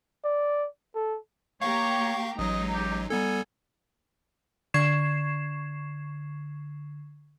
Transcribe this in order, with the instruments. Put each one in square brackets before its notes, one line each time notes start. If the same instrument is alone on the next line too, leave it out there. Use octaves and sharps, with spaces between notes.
[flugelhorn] D5
A4
[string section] A#3 G4 A#5 [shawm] C#5 [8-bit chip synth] F5 C#6
[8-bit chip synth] A1 F#3 [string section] G#3 D#4 [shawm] D#5
[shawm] G4
[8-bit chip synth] G3 B3 A4 [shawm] G#5
[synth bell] D3 C#6 G#6 C7 E7